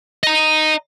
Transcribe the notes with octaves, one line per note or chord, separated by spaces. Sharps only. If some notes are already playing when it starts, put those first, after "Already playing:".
D#5 A#5